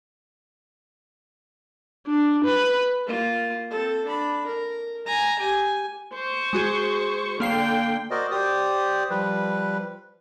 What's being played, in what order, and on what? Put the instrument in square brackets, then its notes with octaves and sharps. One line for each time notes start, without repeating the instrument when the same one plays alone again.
[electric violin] D4
B4
[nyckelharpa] A#3 F4
C4 A4
D4 B5
A#4
G#5 A#5
G4 G#5
[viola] C5 C#6
[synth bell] G#3 F#4 G#4
[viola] D3 G5 [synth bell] A#3 F5 C7
[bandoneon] F#4 A#4 C5 D5 D#5
G4 C5 D5 D#6
F3 G3 B4